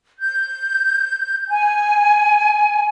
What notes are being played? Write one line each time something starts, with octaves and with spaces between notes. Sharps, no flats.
G6
G#5